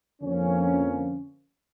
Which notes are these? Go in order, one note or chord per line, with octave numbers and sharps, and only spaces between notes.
F2 D3 F3 A#3 C#4